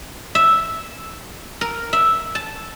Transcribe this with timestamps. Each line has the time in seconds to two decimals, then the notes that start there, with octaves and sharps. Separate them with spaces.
0.35 E5
1.61 A#4
1.93 E5
2.35 A5